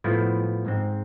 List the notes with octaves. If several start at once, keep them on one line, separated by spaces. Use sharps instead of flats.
A2 F3 B3 E4
G#2 G#3 C4